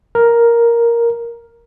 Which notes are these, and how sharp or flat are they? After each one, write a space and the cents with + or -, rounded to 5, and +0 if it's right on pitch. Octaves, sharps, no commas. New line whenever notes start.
A#4 +5